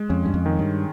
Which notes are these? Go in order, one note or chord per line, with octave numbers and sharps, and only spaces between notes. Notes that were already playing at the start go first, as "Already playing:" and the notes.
Already playing: G#3
F2 C#4
G2
F2
D#3
G2